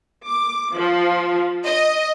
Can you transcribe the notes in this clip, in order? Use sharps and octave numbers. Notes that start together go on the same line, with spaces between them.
D6
F3
D#5